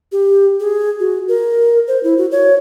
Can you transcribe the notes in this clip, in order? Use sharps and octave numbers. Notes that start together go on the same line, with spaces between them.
G4
G#4
F#4
A#4
C5
E4
F#4
C#5